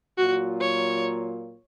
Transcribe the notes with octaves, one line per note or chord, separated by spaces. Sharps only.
A#2 F#3 A#3 F4 F#4
C#5